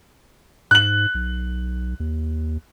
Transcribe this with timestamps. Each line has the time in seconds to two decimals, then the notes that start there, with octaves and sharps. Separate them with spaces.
0.71 G#2 F#6 F#7
1.15 B1
2.00 D#2